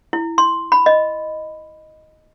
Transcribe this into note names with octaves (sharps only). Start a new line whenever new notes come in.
E4
C6
B5
D#5